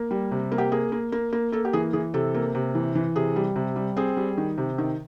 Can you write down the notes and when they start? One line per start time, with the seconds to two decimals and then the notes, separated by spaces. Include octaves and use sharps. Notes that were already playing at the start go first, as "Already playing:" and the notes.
Already playing: A#3
0.11 G3
0.31 C3
0.52 A#3
0.58 G4
0.72 A#3 G#4
0.92 A#3
1.12 A#3
1.33 A#3
1.52 A#3 A4
1.65 G4
1.73 E3 G#4
1.93 E3 G#4
2.14 C3 A4
2.35 A#3
2.55 C3
2.75 E3
2.95 E3
3.15 C3 G#4
3.36 G3
3.56 C3
3.76 G3
3.97 C4 G#4
4.17 G3
4.37 D#3
4.58 C3
4.78 D#3